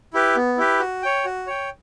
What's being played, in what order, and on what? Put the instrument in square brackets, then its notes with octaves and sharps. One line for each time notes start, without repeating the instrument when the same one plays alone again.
[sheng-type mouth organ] E4 G4 B4
B3
E4 G4 B4
F#4
C#5 G5
F#4
C#5 G5